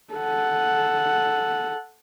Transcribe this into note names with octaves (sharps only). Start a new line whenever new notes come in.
A4 F#5